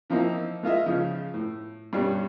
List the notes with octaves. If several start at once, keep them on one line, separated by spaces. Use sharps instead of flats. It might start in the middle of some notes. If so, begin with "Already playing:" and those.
E3 F3 A#3 C4 D#4
G#3 F4 D#5 E5
C#3 F3
A2
G2 B2 G3 C#4 G4